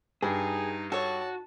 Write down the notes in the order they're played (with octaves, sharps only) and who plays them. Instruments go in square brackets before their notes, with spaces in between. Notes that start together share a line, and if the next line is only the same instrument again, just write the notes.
[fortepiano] G2 [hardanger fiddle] D#4 [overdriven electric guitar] G#4
[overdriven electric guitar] F#4 [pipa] A4 C#5 [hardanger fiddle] A5